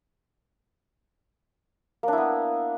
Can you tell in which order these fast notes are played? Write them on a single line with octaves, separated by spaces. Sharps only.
A#3 D4 E4 B3